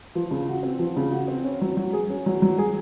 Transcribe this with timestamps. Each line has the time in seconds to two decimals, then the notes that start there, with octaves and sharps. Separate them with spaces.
0.15 F3
0.31 C#3
0.48 F#4
0.63 C4
0.79 F3
0.97 C#3
1.12 F#4
1.28 C4
1.44 C#4
1.61 F#3
1.77 F#3
1.93 G#4
2.10 C#4
2.26 F#3
2.42 F#3
2.58 G#4